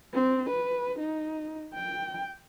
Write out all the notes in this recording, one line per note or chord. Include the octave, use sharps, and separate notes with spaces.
C4
B4
D#4
G5